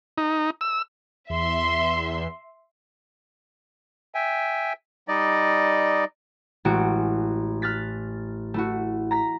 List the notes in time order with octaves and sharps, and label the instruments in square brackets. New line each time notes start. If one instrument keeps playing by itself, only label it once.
[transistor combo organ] D#4
E6
[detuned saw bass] E2 [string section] E5 C6
[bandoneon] E5 G5 G#5
G3 D#4 D5 D#5
[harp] A1 G#3 F#4 D7
F6 F#6 A6 B6
A3 E4 F#4
A#5 A#6 B6